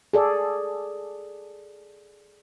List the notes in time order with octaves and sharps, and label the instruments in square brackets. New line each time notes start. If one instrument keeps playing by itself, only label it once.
[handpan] G#4 A4 D5